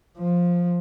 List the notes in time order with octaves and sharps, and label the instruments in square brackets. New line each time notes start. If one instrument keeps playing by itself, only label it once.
[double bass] F3